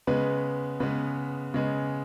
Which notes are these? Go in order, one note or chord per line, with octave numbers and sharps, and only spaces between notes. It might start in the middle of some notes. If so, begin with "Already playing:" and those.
C#3 G#3 B3 B4
C#3 G#3 B3 B4
C#3 G#3 B3